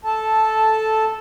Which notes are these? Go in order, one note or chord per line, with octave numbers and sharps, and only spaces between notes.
A4 A5